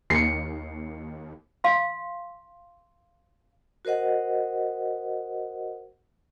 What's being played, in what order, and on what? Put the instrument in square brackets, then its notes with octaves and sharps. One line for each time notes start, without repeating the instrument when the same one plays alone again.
[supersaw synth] D#2 [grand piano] C7 C#7
[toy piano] F5 C6
[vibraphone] F#4 A#4 C5 D#5 F#5